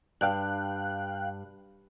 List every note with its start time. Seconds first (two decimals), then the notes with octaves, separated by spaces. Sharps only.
0.21 G2 F5 G5 F#6